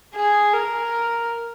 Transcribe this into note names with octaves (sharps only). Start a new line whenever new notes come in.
G#4
A#4